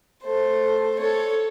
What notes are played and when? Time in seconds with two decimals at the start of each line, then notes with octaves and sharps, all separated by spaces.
0.24 A3 C5
0.99 A4 C#5